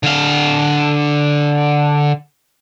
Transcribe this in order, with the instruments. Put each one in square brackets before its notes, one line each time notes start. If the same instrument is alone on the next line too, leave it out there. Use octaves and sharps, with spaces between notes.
[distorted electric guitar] D3 F5